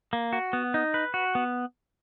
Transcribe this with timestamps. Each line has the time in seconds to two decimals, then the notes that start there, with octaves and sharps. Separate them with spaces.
0.13 A#3
0.33 F#4
0.53 B3
0.74 D#4
0.94 B4
1.14 F#4
1.35 B3